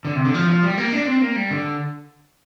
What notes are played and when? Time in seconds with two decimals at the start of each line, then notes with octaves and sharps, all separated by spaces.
0.05 D3
0.16 C3
0.24 D3
0.34 F3
0.49 F3
0.63 G3
0.78 A#3
0.93 D4
1.07 C4
1.21 A#3
1.36 G3
1.51 D3